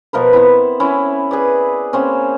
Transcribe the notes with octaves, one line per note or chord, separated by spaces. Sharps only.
B2 F3 A#4 B4
B3 C4 E4
C#4 E4
G#4 B4 D5
A#3 C4 C#4